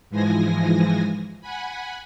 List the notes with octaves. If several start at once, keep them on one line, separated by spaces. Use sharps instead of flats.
G#2 E3 F3 G#3 G#5 A#6
F#5 G#5 B5